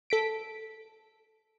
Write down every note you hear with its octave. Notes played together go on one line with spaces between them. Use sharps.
A4 B6 D7